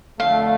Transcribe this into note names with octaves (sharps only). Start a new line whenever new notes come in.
F2 D3 A3 F5